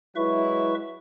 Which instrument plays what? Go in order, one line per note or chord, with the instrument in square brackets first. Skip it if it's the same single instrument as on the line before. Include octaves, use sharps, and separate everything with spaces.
[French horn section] F#3 G#3 E4 [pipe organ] B4 E5 C#6